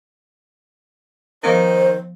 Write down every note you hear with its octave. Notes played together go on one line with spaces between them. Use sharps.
D#3 F3 B3 C5 D#5